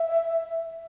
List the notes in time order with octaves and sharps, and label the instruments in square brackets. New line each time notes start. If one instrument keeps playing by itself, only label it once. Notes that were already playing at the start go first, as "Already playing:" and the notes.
Already playing: [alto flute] E5